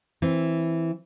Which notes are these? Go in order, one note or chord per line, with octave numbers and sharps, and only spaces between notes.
E3 C4